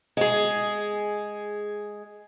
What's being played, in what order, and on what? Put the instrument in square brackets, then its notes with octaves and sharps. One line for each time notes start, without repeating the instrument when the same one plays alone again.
[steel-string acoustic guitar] G#3 G#4